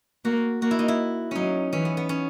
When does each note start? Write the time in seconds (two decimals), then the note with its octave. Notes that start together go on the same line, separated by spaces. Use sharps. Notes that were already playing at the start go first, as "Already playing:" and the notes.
0.25 A#3 F#4
0.62 A#3 F#4
0.71 E4
0.79 D#4
0.88 E4
1.31 F#3 C#4 D#4
1.73 E3 C#4
1.85 B3
1.97 B3
2.09 C#4